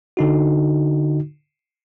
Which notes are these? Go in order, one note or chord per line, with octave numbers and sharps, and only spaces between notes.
D3 D#4 F#4